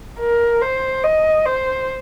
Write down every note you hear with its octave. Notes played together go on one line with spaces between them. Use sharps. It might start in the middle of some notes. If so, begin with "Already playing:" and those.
A#4
C5
D#5
C5